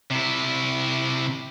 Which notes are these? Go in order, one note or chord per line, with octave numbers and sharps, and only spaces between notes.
C3 E4